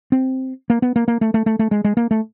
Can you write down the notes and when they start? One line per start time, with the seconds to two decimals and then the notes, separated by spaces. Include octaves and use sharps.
0.12 C4
0.70 A#3
0.82 B3
0.96 A#3
1.08 A#3
1.21 A3
1.34 A3
1.46 A3
1.59 A3
1.71 G#3
1.84 G#3
1.97 A#3
2.11 A3